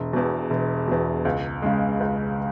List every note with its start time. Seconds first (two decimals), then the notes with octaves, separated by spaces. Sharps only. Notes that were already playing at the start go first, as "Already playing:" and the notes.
Already playing: E1
0.13 E2 B2
0.50 E1
0.88 E2 B2
1.25 C#2
1.62 C#3 G#3
2.00 C#2